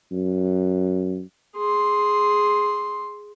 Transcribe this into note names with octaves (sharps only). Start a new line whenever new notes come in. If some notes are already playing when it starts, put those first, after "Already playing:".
F#2
G#4 C6